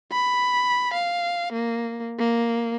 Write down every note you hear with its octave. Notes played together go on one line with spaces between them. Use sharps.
B5
F5
A#3
A#3